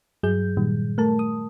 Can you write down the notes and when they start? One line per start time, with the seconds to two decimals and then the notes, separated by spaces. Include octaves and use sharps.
0.23 G2 F#3 G#4 G6
0.57 A#2 D#3 G3
0.98 A3 A#4 A5
1.19 D#6